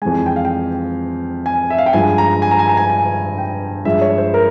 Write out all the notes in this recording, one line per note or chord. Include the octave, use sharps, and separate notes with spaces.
F2 E3 G#3 G#5
G5
F5
G5
G#5
E5
F5
G5
G2 F3 G#3 G#5
A#5
G#5
A#5
G#5
A#5
G#5
G#5
G5
G2 F3 G#3 E5
C#5
C5
A#4